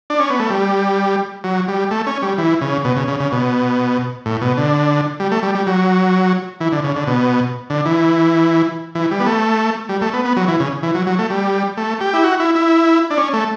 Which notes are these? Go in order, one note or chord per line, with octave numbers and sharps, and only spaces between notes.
D4
C#4
B3
A3
G3
F#3
G3
A3
C#4
G3
E3
C#3
B2
C#3
C#3
C#3
B2
A2
B2
D3
G3
A3
G3
G3
F#3
E3
D3
C#3
D3
B2
D3
E3
E3
G3
B3
A3
G3
A3
B3
B3
F#3
E3
C#3
E3
F#3
F#3
A3
G3
A3
G4
E4
F#4
E4
E4
D4
C#4
A3